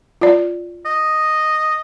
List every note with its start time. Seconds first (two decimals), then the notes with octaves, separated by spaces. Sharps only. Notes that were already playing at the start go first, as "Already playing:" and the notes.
0.21 F4 D5
0.85 D#5